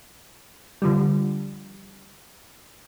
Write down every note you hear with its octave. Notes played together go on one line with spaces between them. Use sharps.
D3 F3 G3